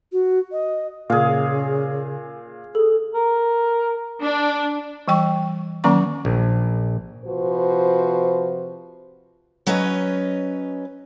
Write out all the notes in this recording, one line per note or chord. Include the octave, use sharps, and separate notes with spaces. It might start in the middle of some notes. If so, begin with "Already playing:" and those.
F#4
D#5
A#2 C#3 G#4 F5
G#4 A4
A#4
D4
E3 G3 G5 C#6
D#3 F#3 A#3 C#4 A#5 C#6
A#1
C3 F3 F#4 B4 C5
F#3 C#4 B4 C#5 D#5